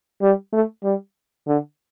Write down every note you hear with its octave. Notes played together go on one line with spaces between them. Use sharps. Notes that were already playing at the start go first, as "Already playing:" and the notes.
G3
A3
G3
D3